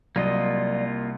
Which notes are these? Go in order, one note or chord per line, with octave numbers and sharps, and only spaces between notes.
C2 F#3 A#3 F4 D5 D#5